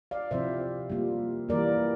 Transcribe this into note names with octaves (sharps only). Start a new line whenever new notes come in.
D5 F5
C3 F3 C4 E4 C5 E5
G3 A#3 F4
E3 G3 A#3 A#4 D5